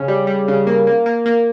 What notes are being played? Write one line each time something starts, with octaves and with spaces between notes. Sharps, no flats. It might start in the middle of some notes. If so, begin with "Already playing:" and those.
Already playing: C#3 C#4
G3
G3
C#3
A#3
A#3
A#3
A#3